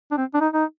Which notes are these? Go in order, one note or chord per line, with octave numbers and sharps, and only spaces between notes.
D4
C4
D4
D#4
D#4